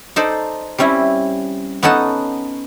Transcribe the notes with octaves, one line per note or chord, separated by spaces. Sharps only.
D#4 A4 C5 D5
G3 C4 C#4 E4
B3 C#4 D#4 A4 F#5